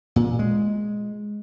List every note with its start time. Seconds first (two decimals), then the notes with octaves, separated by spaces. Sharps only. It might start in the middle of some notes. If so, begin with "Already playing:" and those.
0.16 A#2
0.39 G#3